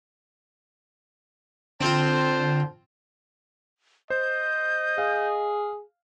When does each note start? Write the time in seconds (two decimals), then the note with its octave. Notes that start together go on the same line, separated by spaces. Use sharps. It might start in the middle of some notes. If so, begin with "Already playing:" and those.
1.81 D3 C4 F4 C5 A5
4.10 C5 D#5 G6
4.98 G#4 F5